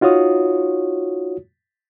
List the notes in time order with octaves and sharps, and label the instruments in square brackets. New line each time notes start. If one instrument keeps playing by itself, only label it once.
[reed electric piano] D#4 F4 F#4 C#5 D#6